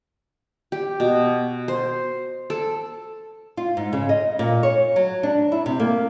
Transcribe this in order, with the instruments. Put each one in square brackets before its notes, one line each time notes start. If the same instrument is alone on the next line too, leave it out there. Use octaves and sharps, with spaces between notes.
[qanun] G4
B2
C5
A4
[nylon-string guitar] F4
G#2
C#3
D#5
A#2
C#5
F#3
D4
E4
C3
A#3